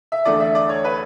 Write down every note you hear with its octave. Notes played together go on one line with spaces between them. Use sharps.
E5
E2 D3 A3 D5
E5
D5
C#5
B4